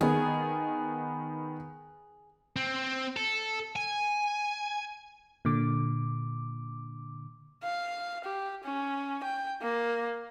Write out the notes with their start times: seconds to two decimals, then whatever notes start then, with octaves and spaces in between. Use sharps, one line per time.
0.01 D#3 B3 G#4
2.56 C4
3.17 A4
3.76 G#5
5.45 A#2 D3 D6
7.63 F5
8.24 G4
8.64 C#4
9.23 G5
9.62 A#3